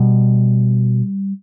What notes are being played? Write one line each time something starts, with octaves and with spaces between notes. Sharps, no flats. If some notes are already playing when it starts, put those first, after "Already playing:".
Already playing: B2 G3